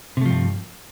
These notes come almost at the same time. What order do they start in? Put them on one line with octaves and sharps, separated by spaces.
C3 A3 F3 G2